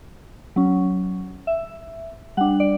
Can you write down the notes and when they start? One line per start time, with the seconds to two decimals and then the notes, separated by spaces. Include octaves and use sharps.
0.56 F#3 C#4
1.47 E5
2.37 G3 D4 F#5
2.60 D5